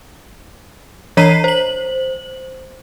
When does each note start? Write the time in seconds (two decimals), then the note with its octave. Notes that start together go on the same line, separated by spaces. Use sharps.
1.17 E3 C#5 A#5 B6 C7 D#7
1.44 C5 F#7